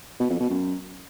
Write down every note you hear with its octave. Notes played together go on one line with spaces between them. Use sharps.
B2
F2
B2
F#2